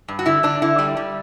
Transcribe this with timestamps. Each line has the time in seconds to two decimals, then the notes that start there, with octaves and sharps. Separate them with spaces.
0.08 G2
0.19 F#4
0.26 D3 E4
0.43 D3 D4
0.62 D3 E4
0.78 G3 D5
0.97 G3